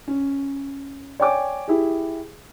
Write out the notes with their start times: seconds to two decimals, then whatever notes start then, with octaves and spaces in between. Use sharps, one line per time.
0.08 C#4
1.20 C#5 D5 G5 G#5 D6
1.68 E4 G4 G#4